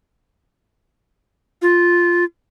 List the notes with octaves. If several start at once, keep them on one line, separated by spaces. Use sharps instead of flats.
F4